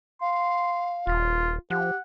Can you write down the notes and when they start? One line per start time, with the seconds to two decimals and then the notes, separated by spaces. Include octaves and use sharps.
0.21 F5 C6
1.07 D#1 F4
1.70 F3 G4 F#5